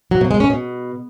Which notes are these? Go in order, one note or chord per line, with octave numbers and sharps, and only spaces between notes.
F#3
B2
G#3
C#4
B2